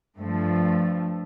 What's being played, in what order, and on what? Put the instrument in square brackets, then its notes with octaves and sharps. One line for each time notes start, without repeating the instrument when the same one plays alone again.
[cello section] G2 F3 A3